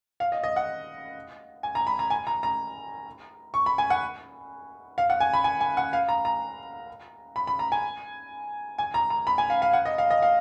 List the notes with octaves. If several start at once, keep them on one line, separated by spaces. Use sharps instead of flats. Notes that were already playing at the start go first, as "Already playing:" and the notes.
F5
D#5
D#5
F#5
G#5
A#5
B5
A#5
G#5
A#5
A#5
C#6
B5
G#5
F#5
F5
F#5
G#5
B5
G#5
G#5
F#5
F5
A#5
A#5
B5
B5
A#5
G#5
G#5
A#5
A#5
B5
G#5
F5
F5
F#5
D#5
F5
D#5
F5